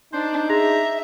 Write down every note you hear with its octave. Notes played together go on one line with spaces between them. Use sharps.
D4 D#4 C5
G#4 E5 A#5